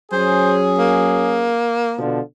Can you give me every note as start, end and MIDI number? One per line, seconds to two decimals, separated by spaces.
0.12 1.57 54
0.12 1.57 61
0.12 1.57 68
0.12 0.57 72
0.78 1.99 58
1.98 2.20 47
1.98 2.20 50
1.98 2.20 53